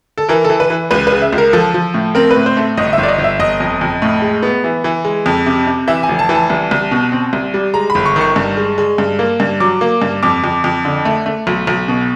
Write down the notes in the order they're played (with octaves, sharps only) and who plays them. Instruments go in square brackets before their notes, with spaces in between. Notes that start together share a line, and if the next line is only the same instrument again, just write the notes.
[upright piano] A4
E3 A#4
E3 A4
B4
E3
C#2 B4
C#3 B4
E5
C#2
A#4
F3 A4
F3
A2
C4 A#4
B4
A2
C5
A3
G1 D#5
E5
G1
D5
D#5
G1
E5
G1 D#5
F2
F2
A2
G#3
B3
E3
E3
G#3
F2
C3
C3
E3 E5
G#5
F1
A5
E3
A5
C2
C2
B2
C4
C2
G3
G#3 A#5
B5
G1
C#6
D#3 C#6
G2
G#3
G#3
G2
A#3
G2
F#3 D6
A#3
G2
F2 D6
F2
F2
D3
A3
A3
B1
B1
B2